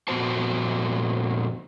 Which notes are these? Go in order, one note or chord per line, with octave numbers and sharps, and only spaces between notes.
F2 A#2 B3 F#4 C5 A5